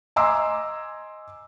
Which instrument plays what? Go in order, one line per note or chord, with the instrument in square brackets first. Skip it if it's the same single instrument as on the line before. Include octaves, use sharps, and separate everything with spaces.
[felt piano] D#5 G#5 A#5 C6 D6 E6